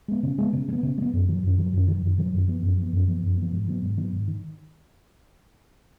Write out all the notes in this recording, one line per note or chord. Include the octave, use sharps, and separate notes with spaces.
G#3 B3
C#3
G#3 B3
C#3
G#3
B3
C#3
G#3
B3
F#2
D#3 F#3
F#2
D#3 F#3
F#2
D#3 F#3
F#2
D#3 F#3
F#2
F3 B3
F#2
F3 B3
F#2
F3 B3
F#2
F3 B3
G#2
D#3 F#3 B3
G#2
D#3 F#3 B3
G#2
D#3